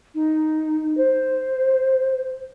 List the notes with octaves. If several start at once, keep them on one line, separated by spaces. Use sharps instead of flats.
D#4
C5